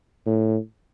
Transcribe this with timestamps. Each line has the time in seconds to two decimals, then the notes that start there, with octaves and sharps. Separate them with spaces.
0.26 A2